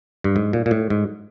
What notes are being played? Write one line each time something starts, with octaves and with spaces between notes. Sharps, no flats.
G2
G#2
A#2
A#2
A2
G#2